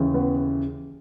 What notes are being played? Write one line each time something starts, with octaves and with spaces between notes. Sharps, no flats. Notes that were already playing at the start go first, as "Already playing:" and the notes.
Already playing: D#2 C#3 E3
B3